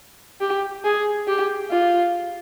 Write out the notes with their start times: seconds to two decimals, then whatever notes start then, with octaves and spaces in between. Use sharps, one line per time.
0.41 G4
0.84 G#4
1.28 G4
1.71 F4